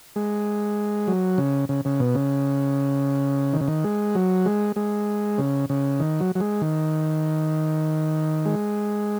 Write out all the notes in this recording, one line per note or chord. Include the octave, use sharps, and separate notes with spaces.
G#3
F#3
C#3
C#3
C#3
B2
C#3
D#3
C#3
D#3
G#3
F#3
G#3
G#3
C#3
C#3
D#3
F#3
F#3
G#3
D#3
G#3